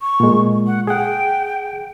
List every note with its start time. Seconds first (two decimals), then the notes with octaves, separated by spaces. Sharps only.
0.01 C#6
0.20 A#2 G#3
0.67 F#5
0.87 G#4 F#5 G5